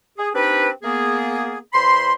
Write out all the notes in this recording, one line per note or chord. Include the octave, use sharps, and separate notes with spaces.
G#4
C4 D4 D#4 G4 B4
A#3 B3 G#4
E2 C5 B5 C6